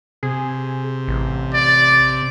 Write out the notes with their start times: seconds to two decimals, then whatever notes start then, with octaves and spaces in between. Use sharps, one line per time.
0.23 C3 G#4
1.07 A1
1.54 D5